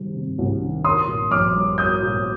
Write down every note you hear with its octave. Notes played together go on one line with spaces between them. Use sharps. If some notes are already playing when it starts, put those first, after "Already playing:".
Already playing: C3 D#3 G3
C3
C2
D#3
A#3 C6 D#6
A#2
A#1 D6 F6
G3
A#3 D#6 G6
A#2